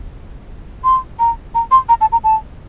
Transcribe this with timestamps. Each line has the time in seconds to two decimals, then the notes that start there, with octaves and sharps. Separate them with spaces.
0.84 C6
1.19 A#5
1.55 A#5
1.71 C6
1.89 A#5
2.01 A5
2.12 A#5
2.24 A5